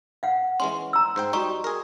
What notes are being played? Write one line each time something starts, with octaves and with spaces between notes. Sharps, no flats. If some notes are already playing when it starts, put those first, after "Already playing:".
F5 F#5
E3 G#3 C#4 C6
A#5 E6
G#2 C5 G5
G3 D#4 F#4 A#5 C#6
G#4 A#4